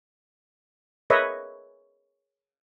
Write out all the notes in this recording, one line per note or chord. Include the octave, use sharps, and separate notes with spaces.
G#4 A#4 B4 C#5 D#5 E5